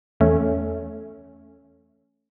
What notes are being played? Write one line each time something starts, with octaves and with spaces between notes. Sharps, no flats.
E2 A3 C#4